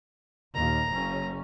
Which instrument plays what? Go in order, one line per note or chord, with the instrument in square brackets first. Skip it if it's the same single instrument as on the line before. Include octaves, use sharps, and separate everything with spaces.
[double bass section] D#2 A#2 [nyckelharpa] A#5
[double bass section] F#1 C#4